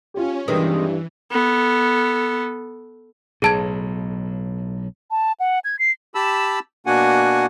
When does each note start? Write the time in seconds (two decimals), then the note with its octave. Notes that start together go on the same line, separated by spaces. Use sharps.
0.14 C#4 F4 G4
0.48 G2 C3 D#3 E3 G#3 B4
1.31 B3 A4
3.42 B1 A2 G#4 A5 G#6
5.11 A5
5.40 F#5
5.64 G#6
5.79 C7
6.15 G4 A5 B5 E6
6.86 B2 A#3 D4 F#4 F#5 G#5